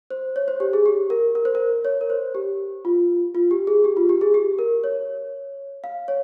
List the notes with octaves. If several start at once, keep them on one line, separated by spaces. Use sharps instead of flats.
C5
C#5
C5
G4
G#4
G4
A#4
A#4
C5
A#4
C#5
A#4
C5
G4
F4
F4
G4
G#4
G4
F4
G4
G#4
G4
A#4
C#5
F5
C#5